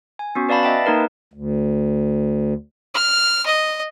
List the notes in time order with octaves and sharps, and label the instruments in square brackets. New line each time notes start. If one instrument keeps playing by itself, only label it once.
[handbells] G#5
B3 C#4 F#4
B4 D5 F5 A5 B5 A6
D#5 E5 G5 A5
A#3 D#4 A#4 B4
[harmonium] D2
[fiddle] F6
D#5